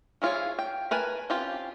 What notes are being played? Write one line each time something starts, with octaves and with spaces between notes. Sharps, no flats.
F3 E4 F4 G#4 C#5
G5
A#4 B4 G#5 A5
C4 C#4 F4 G4